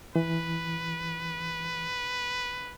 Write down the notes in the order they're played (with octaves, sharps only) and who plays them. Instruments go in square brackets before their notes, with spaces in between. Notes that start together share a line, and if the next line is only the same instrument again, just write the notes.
[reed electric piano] E3 [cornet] B4